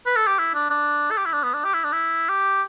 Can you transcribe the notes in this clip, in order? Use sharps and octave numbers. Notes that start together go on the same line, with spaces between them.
B4
A4
G4
E4
D4
D4
A4
G4
E4
D4
B3
D4
G4
E4
D4
E4
G4